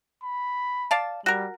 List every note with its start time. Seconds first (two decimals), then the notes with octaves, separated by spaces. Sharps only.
0.24 B5
0.91 D5 F5 A5
1.26 G3 F#4 A#4